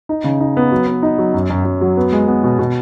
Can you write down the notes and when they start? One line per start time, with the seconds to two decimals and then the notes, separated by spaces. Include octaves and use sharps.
0.09 D#4
0.24 C#3
0.40 D#4
0.57 B3
0.72 F#3
0.87 B3
1.03 D#4
1.18 F#3
1.34 F#2
1.50 F#2
1.65 F#2
1.81 F#3
1.97 B3
2.12 G#3
2.27 B3
2.44 B2
2.59 B2